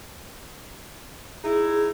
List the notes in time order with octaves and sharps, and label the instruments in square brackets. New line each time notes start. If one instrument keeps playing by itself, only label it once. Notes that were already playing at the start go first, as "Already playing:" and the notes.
[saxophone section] D#4 E4 [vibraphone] G#4